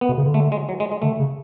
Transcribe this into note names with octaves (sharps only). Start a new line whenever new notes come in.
B3
B2
C#3
D3
A3
G#3
F#3
G#3
G#3
D3 A3
C#3